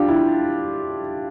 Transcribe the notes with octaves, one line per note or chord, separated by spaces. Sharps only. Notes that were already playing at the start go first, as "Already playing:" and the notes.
Already playing: D4 F4 G4
E4